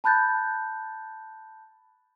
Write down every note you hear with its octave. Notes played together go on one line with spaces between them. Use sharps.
A5 B5 F#6 G6 A6